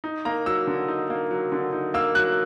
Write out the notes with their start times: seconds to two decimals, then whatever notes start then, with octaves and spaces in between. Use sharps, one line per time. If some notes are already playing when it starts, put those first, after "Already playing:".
0.04 D#4
0.25 A#3 A#5
0.46 F#3 E6
0.67 D3
0.88 D#4
1.10 A#3
1.31 F#3
1.52 D3
1.73 D#4
1.94 A#3 E6
2.15 F#3 F#6